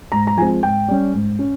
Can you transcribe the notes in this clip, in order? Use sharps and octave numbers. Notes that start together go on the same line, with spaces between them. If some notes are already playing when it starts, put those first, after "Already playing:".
G#2 A#5
A#5
F3 G#3 C4 G#5
G#2 G5
G3 C#4
G#2
C#4